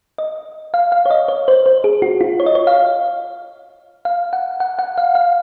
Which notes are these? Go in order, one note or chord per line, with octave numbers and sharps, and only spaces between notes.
D#5
F5
F5
C#5
D#5
C#5
C5
C5
G#4
F#4
F4
C#5
D#5
C#5
F5
F5
F#5
F#5
F#5
F5
F5